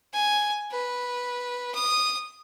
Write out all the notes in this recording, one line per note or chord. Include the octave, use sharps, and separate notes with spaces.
G#5
B4
D#6